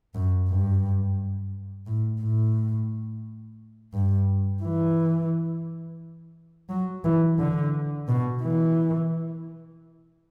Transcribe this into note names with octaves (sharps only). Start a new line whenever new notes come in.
F#2
G2
A2
A2
G2
E3
F#3
E3
D3
B2
E3